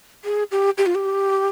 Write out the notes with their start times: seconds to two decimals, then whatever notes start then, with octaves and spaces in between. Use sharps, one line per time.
0.25 G#4
0.51 G4
0.78 G4
0.86 F4
0.95 G4